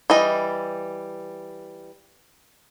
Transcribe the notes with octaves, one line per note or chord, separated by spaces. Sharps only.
E3 G3 D#5